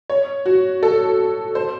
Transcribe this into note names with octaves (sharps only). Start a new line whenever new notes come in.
C#5
F#4
A4
C5